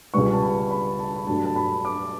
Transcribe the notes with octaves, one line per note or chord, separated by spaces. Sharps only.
C#2 C#3 G3 B3 C#6
A5
B5
B5
A5
B5
G2 F#3 A3 A5
A5
B5
D6